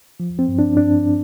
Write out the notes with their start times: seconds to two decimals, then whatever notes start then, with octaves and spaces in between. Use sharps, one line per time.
0.20 F3
0.39 C4
0.48 G2
0.59 D4
0.77 G2 D4